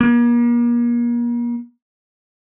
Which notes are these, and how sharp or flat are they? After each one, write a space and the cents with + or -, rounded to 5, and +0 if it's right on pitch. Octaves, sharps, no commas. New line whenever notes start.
A#3 +40